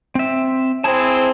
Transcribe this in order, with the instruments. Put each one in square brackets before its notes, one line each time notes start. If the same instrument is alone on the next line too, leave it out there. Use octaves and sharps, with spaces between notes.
[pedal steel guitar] C4 E5
[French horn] C4 [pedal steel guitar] E4 G#4 A5